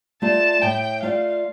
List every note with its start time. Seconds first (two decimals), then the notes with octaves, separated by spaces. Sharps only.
0.22 A3 F4 D5 A5
0.62 A2 G5
1.02 A3 F4 D5 F5